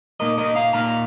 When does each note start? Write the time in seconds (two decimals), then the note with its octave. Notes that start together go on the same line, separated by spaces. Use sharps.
0.20 A#2 A#3 D#4 A#4 D#5
0.38 A#4 D#5
0.56 F5 A#5
0.73 A#2 A#3 D#4 F5 A#5